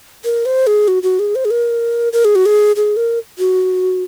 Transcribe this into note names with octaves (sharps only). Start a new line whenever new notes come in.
A#4
C5
G#4
F#4
F#4
G#4
C5
G#4
A#4
A#4
G#4
F#4
G#4
G#4
A#4
F#4